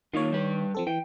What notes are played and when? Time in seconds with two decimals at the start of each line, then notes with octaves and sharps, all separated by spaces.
0.14 D#3 A#3 D#4 F4 C#5
0.32 G3 G4 B4
0.75 F3 C4 A4
0.87 E3 G5